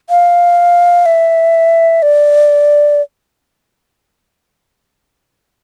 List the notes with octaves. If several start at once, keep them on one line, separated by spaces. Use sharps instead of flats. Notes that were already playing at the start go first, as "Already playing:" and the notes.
F5
E5
D5